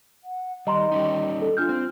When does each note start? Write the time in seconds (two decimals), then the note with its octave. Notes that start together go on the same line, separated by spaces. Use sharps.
0.24 F#5
0.67 D#3 G3 D#5 A#5 C6
0.92 G3 C#4 D#4
1.42 A4
1.57 D4 F4 F6 G6
1.69 C4